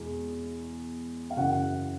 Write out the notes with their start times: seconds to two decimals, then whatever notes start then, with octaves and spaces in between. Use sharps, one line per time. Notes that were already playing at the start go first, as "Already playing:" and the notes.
Already playing: E2 B2 G#3
1.30 F5
1.37 F#1 F#2 C#3 E3 F#4 F#5